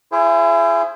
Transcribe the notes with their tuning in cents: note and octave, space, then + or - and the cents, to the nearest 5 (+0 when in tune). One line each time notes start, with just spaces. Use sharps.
E4 +35 G#4 +0 C5 +0